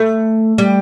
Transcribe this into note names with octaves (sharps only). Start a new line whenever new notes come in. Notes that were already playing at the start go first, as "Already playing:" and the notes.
Already playing: A3
G3